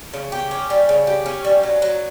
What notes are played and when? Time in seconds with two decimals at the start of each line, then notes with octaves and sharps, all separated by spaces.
0.14 C#3
0.32 G4
0.51 C#4
0.70 G3
0.89 C#3
1.07 G4
1.26 C#4
1.45 G3
1.63 F#3
1.82 F#3